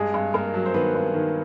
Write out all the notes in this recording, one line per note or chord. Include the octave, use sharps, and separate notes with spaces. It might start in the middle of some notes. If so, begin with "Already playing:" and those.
Already playing: G2 G#3 G#4
G2
G2 A#3 A#4
F#3
C5
D#3 B3 B4
G2
D#3